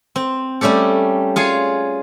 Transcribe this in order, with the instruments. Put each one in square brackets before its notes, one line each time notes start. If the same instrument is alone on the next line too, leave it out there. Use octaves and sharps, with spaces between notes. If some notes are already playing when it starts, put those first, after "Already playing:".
[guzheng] C4
G3 A3 C#4 G4 A4
F4 G#4 C#5